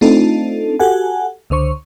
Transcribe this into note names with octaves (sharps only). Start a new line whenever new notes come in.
A3 C4 D4 D#4 F4 A4
F#4 G4 A4 F#5 G#5
C#2 D3 C5 C#6